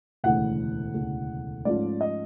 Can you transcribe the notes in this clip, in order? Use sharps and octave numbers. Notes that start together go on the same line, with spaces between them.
E1 D2 C#3 E3 A3 F#5
E1 D2 C#3 E3 A3
G#2 F3 A3 C#4 F4 D5
D#5